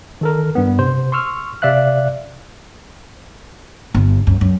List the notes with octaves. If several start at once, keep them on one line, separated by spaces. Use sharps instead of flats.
D#3 A4 A#4
G2 B3
C3 C5
C6 C#6 E6 F6
C3 D5 E5 F5 F#6
G1
F#2
F#2